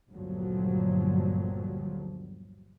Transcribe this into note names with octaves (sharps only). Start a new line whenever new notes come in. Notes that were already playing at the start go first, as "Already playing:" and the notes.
G1 D2 G2 A#2 F3 F#3